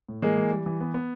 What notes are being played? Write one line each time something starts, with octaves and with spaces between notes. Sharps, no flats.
A2
E3 G#3 A#3
E3
G3
E3
B3
B3